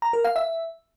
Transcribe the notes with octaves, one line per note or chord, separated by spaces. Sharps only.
A#5
A#4
F5
E5